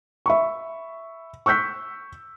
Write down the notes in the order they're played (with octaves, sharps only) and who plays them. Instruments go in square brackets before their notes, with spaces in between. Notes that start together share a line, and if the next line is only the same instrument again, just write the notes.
[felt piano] E5 B5 C#6
C#6 E6 F#6 G6 B6